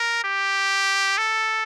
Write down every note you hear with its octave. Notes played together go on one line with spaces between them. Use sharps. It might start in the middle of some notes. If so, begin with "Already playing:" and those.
Already playing: A#4
G4
A4